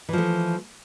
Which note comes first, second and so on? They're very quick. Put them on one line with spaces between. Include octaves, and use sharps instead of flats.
E3 F3 A3